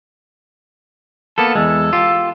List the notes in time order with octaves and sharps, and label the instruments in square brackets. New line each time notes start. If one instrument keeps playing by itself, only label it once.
[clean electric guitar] A#3 B3 A4 [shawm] A5
[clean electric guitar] E2 G#3 [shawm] A4
[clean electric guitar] F4 G4